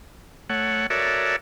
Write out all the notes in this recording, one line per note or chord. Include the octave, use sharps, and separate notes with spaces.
A3 C#5 F#5
F#4 A4 A#4 C#5 D5 E5